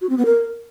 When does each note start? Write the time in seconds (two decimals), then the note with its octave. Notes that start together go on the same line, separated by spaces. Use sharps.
0.01 F#4
0.09 C4
0.18 B3
0.26 A#4